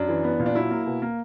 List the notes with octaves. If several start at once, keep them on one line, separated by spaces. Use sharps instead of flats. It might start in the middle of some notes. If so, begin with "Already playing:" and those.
Already playing: F#2 D4
E3
B3
A#2
D4
F#3 E4
A#3
B2
A#3